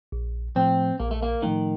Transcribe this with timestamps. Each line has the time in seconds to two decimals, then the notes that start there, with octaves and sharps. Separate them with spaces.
0.12 A#1
0.55 A2 F3 A3 C4
0.99 A#1 A#3
1.11 A3
1.22 A#3
1.42 A2 D#3 F3 A3